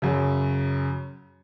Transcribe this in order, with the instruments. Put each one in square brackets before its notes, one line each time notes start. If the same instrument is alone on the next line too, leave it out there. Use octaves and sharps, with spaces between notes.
[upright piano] F#2 C#3